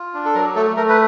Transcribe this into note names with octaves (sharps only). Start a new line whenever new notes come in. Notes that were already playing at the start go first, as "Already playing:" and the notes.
Already playing: F4
D4
A4
F#3 A#4
A3 A4
A3 A#4
B4